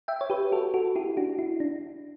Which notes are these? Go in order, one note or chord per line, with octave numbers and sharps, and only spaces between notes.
E5 G5
C#5
G4 B4
F#4 A4
F#4 A4
E4 G4
D4 F#4
E4
D4